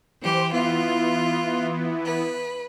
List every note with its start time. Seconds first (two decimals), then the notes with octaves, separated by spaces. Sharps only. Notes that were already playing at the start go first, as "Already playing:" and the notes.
0.22 E3 G4 C5
0.52 E3 B3 E4 F4
2.04 B4